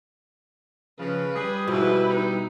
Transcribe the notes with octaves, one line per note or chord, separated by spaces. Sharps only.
C#3 F3 B4
G3 G#4
G#2 B2 F3 E4 B4
D#4